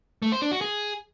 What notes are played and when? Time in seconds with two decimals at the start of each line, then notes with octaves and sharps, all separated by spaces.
0.22 A3
0.32 C5
0.42 D4
0.52 F#4
0.61 G#4